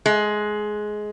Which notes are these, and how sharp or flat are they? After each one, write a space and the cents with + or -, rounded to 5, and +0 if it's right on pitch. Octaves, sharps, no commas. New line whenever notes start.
G#3 +15